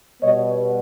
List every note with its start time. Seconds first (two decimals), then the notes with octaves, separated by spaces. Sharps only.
0.21 B2 G3 B3 C#5 D#5